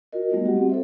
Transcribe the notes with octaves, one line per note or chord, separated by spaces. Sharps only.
F4 F#4 A#4 D#5
G3 A3 B3 D#4 D#5
F#4 G4 F#5
C4
A4 C5 E5